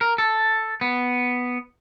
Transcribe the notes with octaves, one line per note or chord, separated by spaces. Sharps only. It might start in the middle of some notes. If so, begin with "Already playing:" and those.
A#4
A4
B3